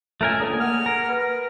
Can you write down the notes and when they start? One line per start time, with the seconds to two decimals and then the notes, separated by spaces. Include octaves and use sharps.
0.21 C#2 A3 A#4 G#5
0.40 C#2 A2 D3 A#3 G#4
0.61 F#5 F6
0.86 A#4
1.09 B4